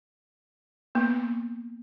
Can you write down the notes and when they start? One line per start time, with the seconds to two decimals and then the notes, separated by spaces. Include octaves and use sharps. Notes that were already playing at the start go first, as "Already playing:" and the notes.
0.95 A#3 B3